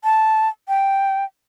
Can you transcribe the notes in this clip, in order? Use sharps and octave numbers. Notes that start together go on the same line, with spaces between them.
A5
G5